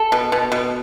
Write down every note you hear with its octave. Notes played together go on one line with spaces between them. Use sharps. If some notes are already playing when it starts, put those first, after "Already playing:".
Already playing: A4
B2
B2
B2